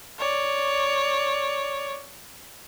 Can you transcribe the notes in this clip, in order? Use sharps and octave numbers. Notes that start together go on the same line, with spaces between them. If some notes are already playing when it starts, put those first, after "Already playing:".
C#5 D5